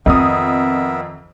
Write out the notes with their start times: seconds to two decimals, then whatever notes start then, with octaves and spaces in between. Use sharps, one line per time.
0.06 F2 D#3 B3 C4 A#4 E5 D#6